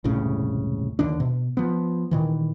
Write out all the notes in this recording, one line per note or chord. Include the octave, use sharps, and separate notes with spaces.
E1 C2 A2 C#3
D#2 D3 D4
B2
F3 B3
A#2 D#3 E3